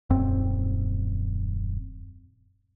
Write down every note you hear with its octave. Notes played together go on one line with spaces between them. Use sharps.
D#1 F#2 C4